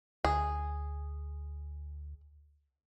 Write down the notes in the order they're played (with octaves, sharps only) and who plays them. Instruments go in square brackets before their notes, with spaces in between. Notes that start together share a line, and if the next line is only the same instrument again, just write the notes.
[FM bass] D2 [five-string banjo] G#4